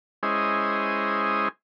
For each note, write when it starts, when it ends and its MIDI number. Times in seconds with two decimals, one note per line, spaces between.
0.23 1.48 56
0.23 1.48 61
0.23 1.48 64
0.23 1.48 68
0.23 1.48 72
0.23 1.48 75